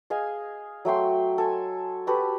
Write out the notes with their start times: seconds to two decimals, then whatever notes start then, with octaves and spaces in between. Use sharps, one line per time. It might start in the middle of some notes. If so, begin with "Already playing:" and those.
0.10 G#4 D#5 F5 G#5
0.85 F#3 A3 G5 C6
1.38 A4 G#5
2.07 F#4 G4 A4 B4